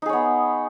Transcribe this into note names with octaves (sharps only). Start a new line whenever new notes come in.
B3 D#4 G#4 C#5